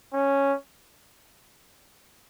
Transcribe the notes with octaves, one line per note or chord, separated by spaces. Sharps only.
C#4